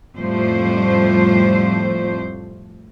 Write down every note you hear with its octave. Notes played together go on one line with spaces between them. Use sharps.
F2 A2 F3 G3 A3 C5